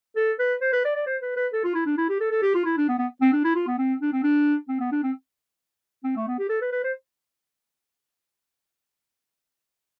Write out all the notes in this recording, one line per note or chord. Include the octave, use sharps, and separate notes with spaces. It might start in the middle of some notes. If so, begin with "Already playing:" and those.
A4
B4
C5
B4
D5
D5
C5
B4
B4
A4
F4
E4
D4
E4
G4
A4
A4
G4
F4
E4
D4
B3
B3
C4
D4
E4
F4
B3
C4
D4
C4
D4
C4
B3
D4
C4
C4
A3
B3
G4
A4
B4
B4
C5